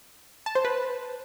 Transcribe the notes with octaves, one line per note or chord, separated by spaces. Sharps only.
A5
C5
B4